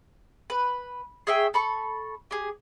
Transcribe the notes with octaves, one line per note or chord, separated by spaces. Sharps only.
B4
G#4 C#5 E5 G5
A4 B5 C#6
G4 G#4